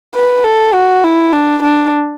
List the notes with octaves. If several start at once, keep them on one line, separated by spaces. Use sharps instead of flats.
B4
A4
F#4
E4
D4
D4